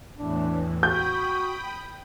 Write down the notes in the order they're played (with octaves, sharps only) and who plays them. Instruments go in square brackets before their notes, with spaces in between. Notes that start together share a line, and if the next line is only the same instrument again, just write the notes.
[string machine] E2 A2 E3 [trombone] D4
[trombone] F#4 [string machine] G5 B5 D#6 [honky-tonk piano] G6